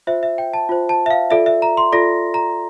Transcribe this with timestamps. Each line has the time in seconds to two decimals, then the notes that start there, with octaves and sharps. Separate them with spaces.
0.07 F4 C5 E5
0.23 E5
0.38 G5
0.54 A5
0.69 F4 C5
0.89 A5
1.06 E5
1.11 F5
1.31 F4 A4 D5 E5
1.46 E5
1.62 A#5
1.77 C6
1.93 F4 A4 D5 A#6
2.34 A#5